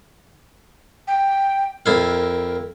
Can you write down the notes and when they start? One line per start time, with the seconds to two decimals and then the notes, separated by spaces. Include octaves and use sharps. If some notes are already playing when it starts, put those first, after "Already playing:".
1.08 G5
1.86 F2 E4 A#4 F5